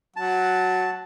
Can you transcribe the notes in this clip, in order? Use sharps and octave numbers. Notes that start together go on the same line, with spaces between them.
F#3 F#5 A5